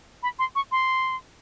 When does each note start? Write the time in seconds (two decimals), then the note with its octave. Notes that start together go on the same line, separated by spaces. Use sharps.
0.23 B5
0.39 C6
0.55 C#6
0.72 C6